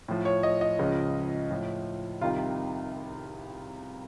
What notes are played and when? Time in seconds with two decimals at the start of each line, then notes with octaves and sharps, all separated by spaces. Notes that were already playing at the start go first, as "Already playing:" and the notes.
0.08 A2 F3
0.25 C#5
0.43 D#5
0.61 D#5
0.79 C#2 C#3 F3
1.51 A2 F3
2.21 C2 C3 D#3 F4